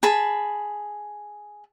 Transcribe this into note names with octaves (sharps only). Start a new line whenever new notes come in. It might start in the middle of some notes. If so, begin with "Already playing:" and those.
G#4 A5 B5